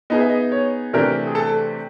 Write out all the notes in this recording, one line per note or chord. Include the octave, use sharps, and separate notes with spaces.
B3 D#4 G#4 D#5
E5
D#5
C#5
C3 E3 A3 D4 G4 A#4
G#4
A4